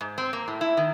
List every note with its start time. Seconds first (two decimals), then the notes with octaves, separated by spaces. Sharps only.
0.01 G#2
0.18 C4
0.33 A#3
0.48 A2
0.61 E4
0.77 D#3